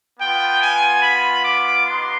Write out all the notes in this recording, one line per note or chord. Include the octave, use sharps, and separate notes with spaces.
B3 F4 G5
G#5
B5
D6
B3 D#4 G4 C6